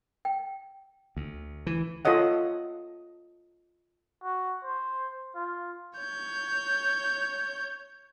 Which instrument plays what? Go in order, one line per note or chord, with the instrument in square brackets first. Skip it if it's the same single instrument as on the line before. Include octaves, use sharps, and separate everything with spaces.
[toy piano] G5
[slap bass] D2
E3
[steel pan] F4 A4 C#5 D#5 F#5
[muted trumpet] F#4
C5
F4
[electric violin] C#5 G6